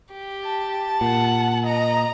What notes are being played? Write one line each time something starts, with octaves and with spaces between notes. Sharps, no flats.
G4
A5
A#2 F#5
D#5 A#5